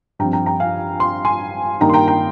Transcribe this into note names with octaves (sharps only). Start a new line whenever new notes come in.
G2 F3 C4 G5 A#5
G5 A#5
G5 A#5
F5 G#5
C6
G#5 C6
G2 D#3 A#3 D#4 G5 A#5
C6
G5 A#5
G5 A#5